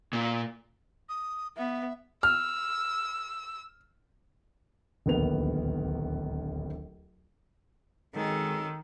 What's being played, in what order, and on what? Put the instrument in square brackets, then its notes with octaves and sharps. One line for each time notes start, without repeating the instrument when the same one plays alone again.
[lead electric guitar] A#2
[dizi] D#6
[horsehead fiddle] B3 [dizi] E5
[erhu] E6 [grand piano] F6
[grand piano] D1 A#1 D#2 B3 A#4 F7
[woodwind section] F#2 C4 A4 [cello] D#3 [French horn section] G#3